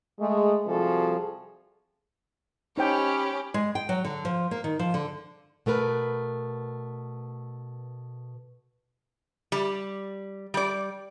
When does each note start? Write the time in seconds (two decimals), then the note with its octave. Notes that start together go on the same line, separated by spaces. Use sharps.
0.20 G#3 A3
0.67 C3 F3 G3 F#4 G#4 A4
2.78 C#4 D#4 G4 C5 G5 B5
3.54 G#3
3.75 G5
3.89 F#3
4.05 D3
4.25 F3
4.51 A#3
4.64 D#3
4.79 F3
4.94 D3
5.66 B2 A3 A#4 B4
9.52 G3
10.54 G3 D5